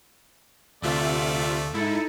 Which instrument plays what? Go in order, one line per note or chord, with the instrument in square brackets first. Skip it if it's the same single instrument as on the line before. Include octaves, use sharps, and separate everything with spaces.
[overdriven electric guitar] D2 [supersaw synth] C3 F4 E5 [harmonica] A3 D5
[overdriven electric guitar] G#2 [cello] D#4 A4 [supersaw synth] E4